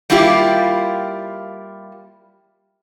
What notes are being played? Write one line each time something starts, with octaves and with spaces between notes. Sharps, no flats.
G3 A#3 E4 F4 G4